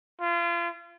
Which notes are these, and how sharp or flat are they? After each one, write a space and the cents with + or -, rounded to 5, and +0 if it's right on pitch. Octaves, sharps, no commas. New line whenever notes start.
F4 -35